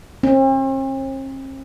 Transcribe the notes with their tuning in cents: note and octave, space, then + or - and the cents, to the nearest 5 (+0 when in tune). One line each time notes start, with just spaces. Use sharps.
C4 +45